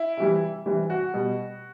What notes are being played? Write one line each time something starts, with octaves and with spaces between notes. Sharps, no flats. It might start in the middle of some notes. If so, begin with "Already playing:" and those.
Already playing: E4
C3 E3 G3
C3 E3 G3
F#4
B2 G3